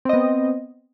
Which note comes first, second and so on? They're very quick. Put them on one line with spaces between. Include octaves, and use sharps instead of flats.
C4 D#5 B3